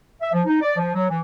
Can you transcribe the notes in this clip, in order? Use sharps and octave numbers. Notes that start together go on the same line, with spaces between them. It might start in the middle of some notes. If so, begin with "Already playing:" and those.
E5
F3
D#4
D5
F3
F#3
E3